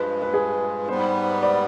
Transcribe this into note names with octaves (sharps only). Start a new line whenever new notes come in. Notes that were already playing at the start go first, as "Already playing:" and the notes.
Already playing: G2 F3 G#3 B4
B4
G#4
G#2 G3 B3 C5
D5